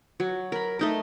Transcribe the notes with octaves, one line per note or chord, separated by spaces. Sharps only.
F#3
A#4 B5
A3 D#4 A#4